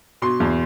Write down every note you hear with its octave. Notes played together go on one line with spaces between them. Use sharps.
B2 C6
E2